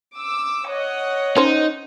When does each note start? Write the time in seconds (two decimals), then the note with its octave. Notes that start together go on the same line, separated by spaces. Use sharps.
0.17 D6 E6
0.67 C#5 D#5 F#5
1.37 C#4 D#4 C5